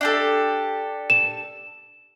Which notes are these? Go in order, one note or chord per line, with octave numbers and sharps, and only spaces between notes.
D4 G4 A4
E7